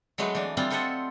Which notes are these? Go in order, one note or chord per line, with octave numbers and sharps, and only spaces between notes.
F#3 G#3 A3 D#4 B4
E3 D4
G3 C4 D4 F4
F4 A4 C5 D#5 E5 F#5